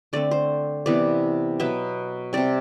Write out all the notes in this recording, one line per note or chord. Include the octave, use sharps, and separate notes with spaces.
D3 A3 C4 D5
C5
C3 E3 B3 D5
B2 F#3 B3 E5
C3 G3 C4 D5